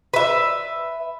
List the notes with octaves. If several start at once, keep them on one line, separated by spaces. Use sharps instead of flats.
B4 E5